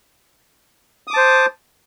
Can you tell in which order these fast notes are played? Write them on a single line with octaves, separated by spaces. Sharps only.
D#6 D6 A5 C5